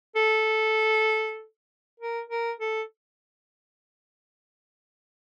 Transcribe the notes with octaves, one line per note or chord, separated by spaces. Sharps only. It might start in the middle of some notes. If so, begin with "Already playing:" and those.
A4
A#4
A#4
A4